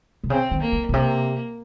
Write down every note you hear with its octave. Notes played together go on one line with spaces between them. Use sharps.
C3
C#3 C4
D#3
A#3
C#3
A#2
C3 A#3